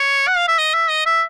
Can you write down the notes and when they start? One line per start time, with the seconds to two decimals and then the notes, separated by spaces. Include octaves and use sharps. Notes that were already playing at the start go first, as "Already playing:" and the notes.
Already playing: C#5
0.28 F#5
0.37 F5
0.48 E5
0.58 D#5
0.74 E5
0.90 D#5
1.06 E5